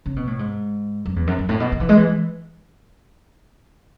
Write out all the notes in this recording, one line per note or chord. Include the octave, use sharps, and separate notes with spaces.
C#3
B2
A2
G#2
F#2
E2
F#2
F#2
A2
B2
D#3
E3
G#3
E3